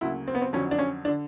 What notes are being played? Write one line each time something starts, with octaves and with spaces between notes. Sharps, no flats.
D2 C#3 F#3 A#3 E4
C4
B3
C4
F2 D3 F#3 C#4
D4
C#4
D4
D3